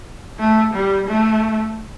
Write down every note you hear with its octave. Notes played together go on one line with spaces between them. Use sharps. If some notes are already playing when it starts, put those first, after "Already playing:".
A3
G3
A3